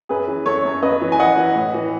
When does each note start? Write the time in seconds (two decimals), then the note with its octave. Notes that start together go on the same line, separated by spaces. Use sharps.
0.09 F#2 G#4 B4
0.28 E3
0.46 F#2 A4 C#5
0.65 F#2
0.83 F#2 B4 D#5
1.02 E3
1.12 G#5
1.19 E3 D#5 F#5
1.37 E3
1.56 A2
1.74 E3